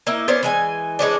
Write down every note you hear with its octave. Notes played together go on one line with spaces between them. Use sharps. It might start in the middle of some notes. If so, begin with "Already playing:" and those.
A#3 D#4 E4
B3 C#4 C5 D5
E3 G#3 G#5
E3 G#3 C#4 D4